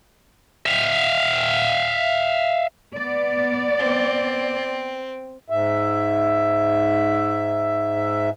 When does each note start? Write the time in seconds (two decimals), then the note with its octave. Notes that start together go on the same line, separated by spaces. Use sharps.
0.66 E5 F5
2.95 B3 D5
3.79 C4
5.50 G#2 E5